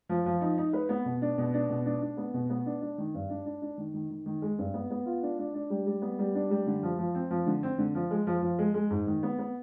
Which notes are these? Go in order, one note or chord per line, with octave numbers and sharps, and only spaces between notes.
F3
F3
D#4
D#4
B4
B3
B2
D4
B2
D4
B2
D4
D4
B3
B2
B3
D4
D4
D#3
G2
D4
D4
D4
D#3
D#3
D#3
D#3
G#3
G2
B3
B3
F4
D4
D4
D4
G3
G3
B3
G3
D4
G3
D3
F3
F3
C4
F3
D3
C4
D3
F3
G#3
F3
F3
G#3
G#3
G#2
D#3
B3
B3